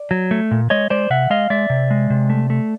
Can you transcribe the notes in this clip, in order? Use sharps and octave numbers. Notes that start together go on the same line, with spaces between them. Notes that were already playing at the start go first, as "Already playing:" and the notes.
Already playing: D5
F#3
A3
A#2
G#3 C#5 D#5
G#3 C5 D5
C3 E5 F#5
G#3 D#5 F5
G#3 D5 E5
C3
G#3
C3
A3
A3